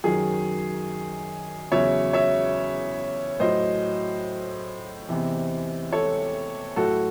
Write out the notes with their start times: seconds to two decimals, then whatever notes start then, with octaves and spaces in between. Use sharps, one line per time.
0.04 F#2 D#3 F#3 G#4
1.71 E2 C#3 F#3 C#5 E5
2.13 C#5 E5
3.40 A2 F#3 C5 D#5
5.09 E2 C3 E3
5.93 A4 C#5
6.76 A2 F#3 F#4 A4